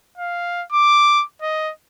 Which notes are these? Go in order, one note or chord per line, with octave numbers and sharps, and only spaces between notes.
F5
D6
D#5